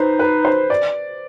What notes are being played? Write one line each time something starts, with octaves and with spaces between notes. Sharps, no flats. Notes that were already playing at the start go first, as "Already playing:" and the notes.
Already playing: D#4 B4 C5
B4
C5
D5